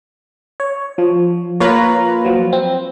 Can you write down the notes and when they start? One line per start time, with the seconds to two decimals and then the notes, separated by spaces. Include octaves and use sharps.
0.60 C#5
0.98 F3
1.60 A#3 F4 B4 C#5 A#5
2.25 F3 F#3
2.53 C4